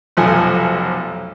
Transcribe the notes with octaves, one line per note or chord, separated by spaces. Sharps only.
F1 B1 F3 A4 G#5